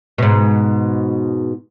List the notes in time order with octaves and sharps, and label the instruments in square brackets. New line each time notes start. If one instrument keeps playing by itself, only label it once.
[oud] G#2 B2